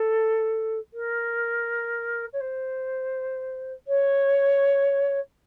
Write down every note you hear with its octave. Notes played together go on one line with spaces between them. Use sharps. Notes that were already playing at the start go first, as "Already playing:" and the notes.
Already playing: A4
A#4
C#5
C5
C#5